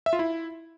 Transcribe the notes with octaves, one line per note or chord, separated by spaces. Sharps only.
E5
F4
E4